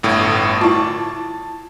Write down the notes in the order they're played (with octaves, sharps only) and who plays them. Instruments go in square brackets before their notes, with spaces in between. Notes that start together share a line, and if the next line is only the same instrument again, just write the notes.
[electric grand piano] G1 A2
[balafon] E4 F4 [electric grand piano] A5